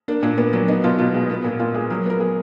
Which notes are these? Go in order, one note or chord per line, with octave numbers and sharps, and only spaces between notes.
A#3 D4
A#2 D4
A#2 B3
F#3 D4
B3 D#4
B2 F4
B2 F4
G#3
B3
A#2
A#2 F4
G#3 G#4
F#3 A#4
B3 A#4
G#4